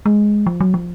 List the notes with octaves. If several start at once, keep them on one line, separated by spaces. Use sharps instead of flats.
G#3
F3
F#3
F3